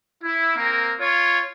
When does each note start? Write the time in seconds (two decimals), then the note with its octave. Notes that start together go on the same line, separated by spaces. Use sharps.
0.22 E4
0.56 A#3 C4 A#4
1.00 F4 C#5